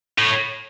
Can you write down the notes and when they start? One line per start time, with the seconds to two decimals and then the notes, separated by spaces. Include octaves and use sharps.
0.18 A2